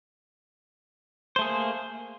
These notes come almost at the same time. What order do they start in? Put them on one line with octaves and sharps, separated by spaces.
C5 A3 G#4 A#3